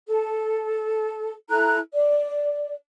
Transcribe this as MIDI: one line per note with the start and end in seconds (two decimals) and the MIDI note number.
0.07 1.33 69
1.50 1.78 64
1.50 1.78 69
1.50 1.78 82
1.50 1.78 90
1.92 2.74 74